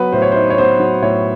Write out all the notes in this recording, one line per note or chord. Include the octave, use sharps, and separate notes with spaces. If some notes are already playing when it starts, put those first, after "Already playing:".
Already playing: F#3 B3 B4
A2 C5
C#5
D#4 C5
C#5
B3 C5
F#3
A2 C#5